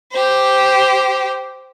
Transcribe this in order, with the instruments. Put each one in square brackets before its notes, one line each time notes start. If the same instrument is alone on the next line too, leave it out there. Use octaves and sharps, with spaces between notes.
[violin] G4 C5